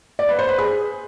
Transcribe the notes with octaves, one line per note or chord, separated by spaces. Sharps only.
D5
B4
C5
B4
G#4